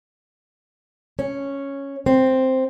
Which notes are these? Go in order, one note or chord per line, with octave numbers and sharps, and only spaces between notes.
C#4
C4